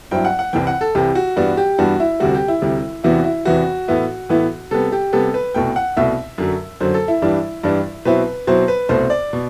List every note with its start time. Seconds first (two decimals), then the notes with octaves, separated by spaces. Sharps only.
0.11 G2 F#3 C4 E4 G5
0.25 F#5
0.39 F#5
0.53 C2 C3 E3 G5
0.67 F#5
0.81 A4
0.95 C2 C3 E3 G4
1.15 F#4
1.36 G2 E3 G3 B3 D4 F#4
1.57 G4
1.78 G2 E3 G3 B3 D4 F#4
2.00 E4
2.20 D2 C3 G3 F#4
2.34 G4
2.48 E4
2.62 D2 C3 G3
3.04 E2 C3 E3 B3 E4 F#4
3.24 E4
3.45 E2 C3 E3 B3 E4 F#4
3.88 A2 E3 B3 E4
4.29 A2 E3 B3 E4
4.71 C3 G3 B3 A4
4.92 G4
5.13 C3 G3 B3 A4
5.34 B4
5.54 C2 B2 A3 G5
5.76 F#5
5.97 C2 B2 A3 E5
6.38 F#2 D3 F#3
6.81 F#2 D3 F#3 C5
6.94 A4
7.08 E4
7.22 G2 E3 G3 D4
7.64 G2 E3 G3 D4
8.05 B2 F#3 C4 E4 B4
8.47 B2 F#3 C4 E4 C5
8.68 B4
8.89 C2 B2 A3 C5
9.10 D5
9.33 B2